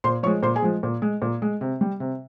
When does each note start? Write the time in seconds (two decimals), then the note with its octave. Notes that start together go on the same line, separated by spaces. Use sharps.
0.04 A#2 C5 C6
0.23 F3 C#5 C#6
0.27 G#3
0.43 A#2 C5 C6
0.56 G#4 G#5
0.62 F3 G#3
0.83 A#2
1.02 G#3
1.22 A#2
1.42 G#3
1.61 C3
1.81 G3
2.00 C3